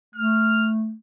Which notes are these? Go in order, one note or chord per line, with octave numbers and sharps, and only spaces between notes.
A3 F6